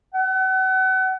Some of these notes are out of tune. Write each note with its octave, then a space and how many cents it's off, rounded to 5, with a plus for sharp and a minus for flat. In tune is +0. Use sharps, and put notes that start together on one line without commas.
F#5 +35